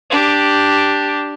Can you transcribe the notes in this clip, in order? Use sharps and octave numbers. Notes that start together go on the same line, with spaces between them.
D4 G4